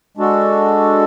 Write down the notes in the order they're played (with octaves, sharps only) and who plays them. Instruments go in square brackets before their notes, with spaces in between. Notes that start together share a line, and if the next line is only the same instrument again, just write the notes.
[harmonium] G#3 D4 F#4 A4